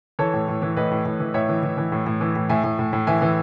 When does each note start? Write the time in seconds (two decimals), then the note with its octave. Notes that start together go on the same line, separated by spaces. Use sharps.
0.19 E3 A4 C#5
0.33 A2
0.48 A2
0.62 E3
0.77 A2 B4 D#5
0.91 A2
1.05 A2
1.20 E3
1.34 A2 C#5 E5
1.49 E3
1.63 E3
1.78 E3
1.92 A2
2.06 A2
2.21 E3
2.36 A2
2.49 A2 E5 G#5
2.64 A2
2.79 A2
2.93 A2
3.07 E3 E5 G#5
3.22 E3